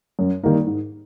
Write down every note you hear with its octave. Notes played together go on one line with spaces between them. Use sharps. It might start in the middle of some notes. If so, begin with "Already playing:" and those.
F#2
D#3 G3 A#3 D#4
G#2